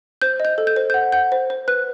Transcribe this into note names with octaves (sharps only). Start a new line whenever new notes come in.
C5 G6
D#5
G6
A4
G6
C5
F#5 G6
F#5 G6
C5
C5
B4 F#6